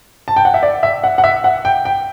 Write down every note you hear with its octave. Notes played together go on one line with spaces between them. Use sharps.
A5
G5
F#5
E5
D5
E5
F#5
F#5
E5
F#5
G5
G5